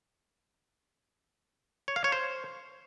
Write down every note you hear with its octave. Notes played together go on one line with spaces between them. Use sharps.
C#5
F5
C#5
C5